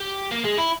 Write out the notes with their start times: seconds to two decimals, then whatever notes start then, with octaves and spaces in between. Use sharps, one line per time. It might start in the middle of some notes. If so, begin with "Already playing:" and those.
Already playing: G4
0.32 A#3
0.45 G#3
0.58 E4